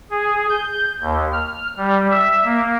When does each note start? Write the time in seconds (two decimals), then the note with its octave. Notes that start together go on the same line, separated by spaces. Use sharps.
0.11 G#4
0.49 G6
1.01 D#2
1.33 F6
1.77 G3
2.10 E5
2.45 A#3